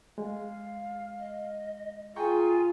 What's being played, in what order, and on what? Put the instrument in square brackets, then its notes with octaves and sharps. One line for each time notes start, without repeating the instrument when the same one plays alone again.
[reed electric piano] G#3 [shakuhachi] F5
[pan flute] D#5
[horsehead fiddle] F4 [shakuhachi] G#4 [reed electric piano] G5 A#5 C#6 [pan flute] G#5